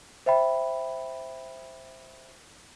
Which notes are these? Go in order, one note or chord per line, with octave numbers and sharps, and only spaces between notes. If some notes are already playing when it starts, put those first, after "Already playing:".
C5 E5 G5 B5